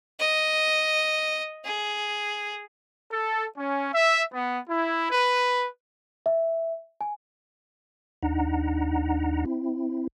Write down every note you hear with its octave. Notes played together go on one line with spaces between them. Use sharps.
D#5
G#4
A4
C#4
E5
B3
E4
B4
E5
G#5
D#2 D4 D#4 F#5 A#5
C4 E4